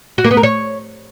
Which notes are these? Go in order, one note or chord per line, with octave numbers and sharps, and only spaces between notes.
F#4
A#3
B3
A#4
C#5